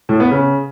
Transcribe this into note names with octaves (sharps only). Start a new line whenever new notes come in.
A2
B3
C#3